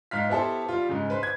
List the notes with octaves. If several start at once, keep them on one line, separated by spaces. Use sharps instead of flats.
G#2 F5 F6 B6
B3 E4 G4 A4 C5
G3 F4
G#2 C#3
B4 C5
G#6